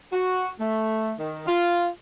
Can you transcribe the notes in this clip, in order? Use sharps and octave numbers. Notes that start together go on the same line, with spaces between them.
F#4
A3
D#3
F4